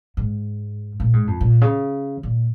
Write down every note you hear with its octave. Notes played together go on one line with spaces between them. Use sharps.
G#2
A#2
G#2
F2
A#2
C#3
A#2